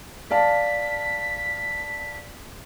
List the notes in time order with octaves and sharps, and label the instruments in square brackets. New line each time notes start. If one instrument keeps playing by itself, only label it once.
[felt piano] D5 F5 A5 [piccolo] B6